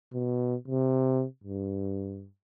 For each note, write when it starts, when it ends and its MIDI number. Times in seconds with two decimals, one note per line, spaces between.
0.14 0.55 47
0.68 1.25 48
1.44 2.28 43